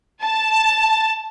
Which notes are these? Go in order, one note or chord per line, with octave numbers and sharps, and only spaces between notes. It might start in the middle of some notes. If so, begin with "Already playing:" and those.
A5